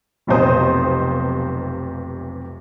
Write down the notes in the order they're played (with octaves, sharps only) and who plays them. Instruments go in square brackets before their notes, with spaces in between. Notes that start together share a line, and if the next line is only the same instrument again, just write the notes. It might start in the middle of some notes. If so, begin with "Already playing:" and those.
[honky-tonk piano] F1 B1 C3 C5 D#6